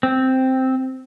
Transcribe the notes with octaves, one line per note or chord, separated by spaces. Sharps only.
C4